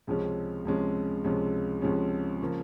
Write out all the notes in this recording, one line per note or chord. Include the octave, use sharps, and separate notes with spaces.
C#2 C3 F3 G#3 C#4
C#2 C3 F3 G#3 C#4
C#2 C3 F3 G#3 C#4
C#2 C3 F3 G#3 C#4
C#3 F3 A#3